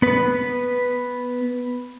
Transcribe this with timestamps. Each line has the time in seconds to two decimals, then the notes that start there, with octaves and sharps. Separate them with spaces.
0.02 B3 B4